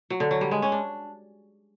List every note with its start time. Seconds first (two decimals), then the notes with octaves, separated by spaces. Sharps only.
0.10 F#3
0.20 D3
0.31 F#3
0.41 G3
0.51 G#3
0.62 C#4
0.72 D4